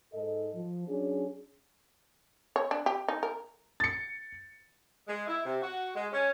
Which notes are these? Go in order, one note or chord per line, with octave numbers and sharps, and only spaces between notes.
G#2 A4 D#5
F3
F#3 C#4 D4 G#4
C#5
D4
G4
D#4
A#4
A6 C#7
G#3
E4
C3
F#4
G#3
C#4